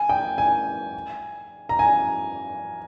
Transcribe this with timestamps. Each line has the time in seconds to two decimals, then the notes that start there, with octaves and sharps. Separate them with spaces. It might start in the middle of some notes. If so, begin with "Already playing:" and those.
Already playing: G#5
0.09 G5
0.38 G#5
1.69 A#5
1.79 G#5